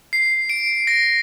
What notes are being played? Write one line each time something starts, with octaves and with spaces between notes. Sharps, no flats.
C7
D7
A#6